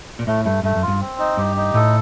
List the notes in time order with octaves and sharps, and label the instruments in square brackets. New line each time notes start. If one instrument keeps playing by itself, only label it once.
[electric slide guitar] A#2
[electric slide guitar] A2 [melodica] A3
[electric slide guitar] G2 [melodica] A3
[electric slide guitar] G2 [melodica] A3
[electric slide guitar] F#2
[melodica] F4
[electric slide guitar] G2
[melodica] C4
D#4
[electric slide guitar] G2 [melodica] G4
[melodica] D#4
[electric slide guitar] A2 [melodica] A4